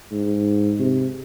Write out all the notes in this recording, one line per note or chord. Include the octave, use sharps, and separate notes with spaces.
G#2
C3